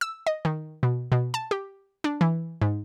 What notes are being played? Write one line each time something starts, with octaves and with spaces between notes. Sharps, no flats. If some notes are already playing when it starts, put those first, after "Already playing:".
E6
D#5
D#3
B2
B2
A5
G4
D4
E3
G#2